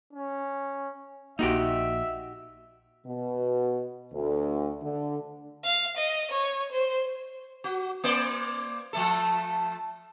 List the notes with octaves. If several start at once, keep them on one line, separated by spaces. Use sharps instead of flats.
C#4
A#1 A#3 D#4 F#4 G4 E5
B2
D2
D3
F5
D#5
C#5
C5
F#4
A#3 C5 D5
F3 A3 A4